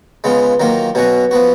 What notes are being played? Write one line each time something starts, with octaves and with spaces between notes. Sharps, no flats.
C#3 G#3 B3 F4
D#3 F#3 A#3 F4
B2 F#3 C#4 F#4
F3 B3 F#4